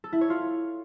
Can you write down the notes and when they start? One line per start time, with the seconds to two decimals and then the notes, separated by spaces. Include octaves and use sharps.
0.04 A4
0.13 E4
0.21 C#5
0.30 F4